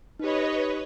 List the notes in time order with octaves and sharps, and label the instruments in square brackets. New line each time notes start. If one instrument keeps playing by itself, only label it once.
[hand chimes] D#4 G4 [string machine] B4 C#5 D#5